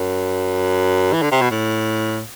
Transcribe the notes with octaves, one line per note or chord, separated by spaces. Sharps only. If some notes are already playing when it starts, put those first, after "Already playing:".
Already playing: F#2
E3
D3
C3
B2
A2